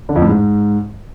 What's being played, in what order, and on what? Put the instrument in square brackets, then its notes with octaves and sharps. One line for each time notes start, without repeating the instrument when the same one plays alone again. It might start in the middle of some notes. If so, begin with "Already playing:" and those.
[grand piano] D3
F2
A2
G#2